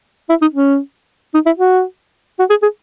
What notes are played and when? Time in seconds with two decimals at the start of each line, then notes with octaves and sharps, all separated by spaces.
0.29 E4
0.41 D#4
0.53 C#4
1.34 D#4
1.46 E4
1.58 F#4
2.39 F#4
2.50 G#4
2.62 G#4